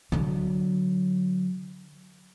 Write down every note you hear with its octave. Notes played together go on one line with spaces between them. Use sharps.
D3 F#3